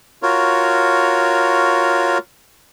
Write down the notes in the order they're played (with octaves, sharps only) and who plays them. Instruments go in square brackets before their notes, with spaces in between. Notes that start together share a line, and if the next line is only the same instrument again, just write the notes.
[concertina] F4 F#4 A#4 C#5